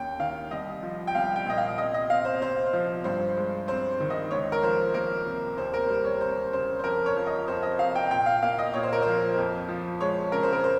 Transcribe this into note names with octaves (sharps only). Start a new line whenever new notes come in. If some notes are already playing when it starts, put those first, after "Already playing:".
Already playing: D#2 A#3 C#4 G5
D#3 F5
C2 D#5
F3
G5
C2 F5
G5
A#2 D#5
F5
C3 D#5
D#5
C4 F5
C5
C3 C5
F3
G2 C5
G#3
C4 C5
D#3
D#5
C#2 C#5
A#4
F3 C5
A#3 A#4
C3
D#2 C5
A#4
G3 C5
C#5
C4 C5
C#3 C5
C5
F2 A#4
C#5
F3
D#5
F2 C5
D#5
C3 F5
G5
A#2 G5
F5
A#3 F5
D#5
A#2 C#5
C5
A#4
F3 C5
F2
F3
G#3 C#5
C#3 A#4
C5
A#4
C5